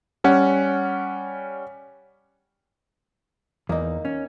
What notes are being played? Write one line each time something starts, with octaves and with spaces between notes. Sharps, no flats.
G3 C#4 F#5
E2 A#3 D#4
C#4